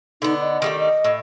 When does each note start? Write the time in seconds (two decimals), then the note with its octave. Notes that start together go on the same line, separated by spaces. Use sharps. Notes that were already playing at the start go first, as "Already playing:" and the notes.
0.22 D3 B3 D#4
0.41 D#5
0.62 D#3 G3 A3
0.79 D#5
1.04 A2